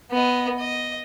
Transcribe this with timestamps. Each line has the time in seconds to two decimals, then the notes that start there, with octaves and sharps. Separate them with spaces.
0.11 B3 D#5
0.59 D#5